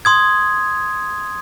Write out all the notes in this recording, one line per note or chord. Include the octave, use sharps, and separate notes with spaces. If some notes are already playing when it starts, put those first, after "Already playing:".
C6 D#6 G#6